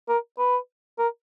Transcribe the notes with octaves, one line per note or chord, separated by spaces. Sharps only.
A#4
B4
A#4